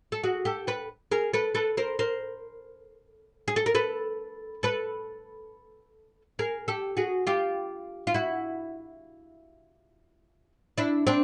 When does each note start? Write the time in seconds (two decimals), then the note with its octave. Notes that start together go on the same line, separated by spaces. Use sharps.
0.12 A4
0.23 F#4 G#4
0.45 G4 A4
0.67 A4 B4
1.12 G#4 A#4
1.33 A4 B4
1.55 A4 B4
1.77 A#4 C5
1.99 A#4 C5
3.48 G#4
3.56 A4
3.66 A#4
3.75 A4 B4
4.63 A4 B4
6.39 G#4 A#4
6.68 G4 A4
6.97 F#4 G#4
7.27 F4 G4
8.07 F4
8.14 E4 F#4
10.78 D4 E4
11.07 C4 D4